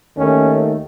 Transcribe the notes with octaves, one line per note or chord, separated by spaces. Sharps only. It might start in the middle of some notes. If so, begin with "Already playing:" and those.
D#2 D#3 A3 C#4